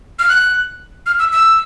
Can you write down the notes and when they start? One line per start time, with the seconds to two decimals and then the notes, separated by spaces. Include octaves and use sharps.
0.19 F6
0.29 F#6
1.06 F6
1.19 E6
1.33 E6